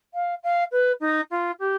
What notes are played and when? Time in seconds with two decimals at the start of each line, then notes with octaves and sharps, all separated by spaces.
0.14 F5
0.43 F5
0.72 B4
1.00 D#4
1.31 F4
1.59 G4